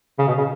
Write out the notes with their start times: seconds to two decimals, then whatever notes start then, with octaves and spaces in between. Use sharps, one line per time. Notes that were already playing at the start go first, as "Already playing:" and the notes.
0.19 C#3
0.27 B2
0.37 C#3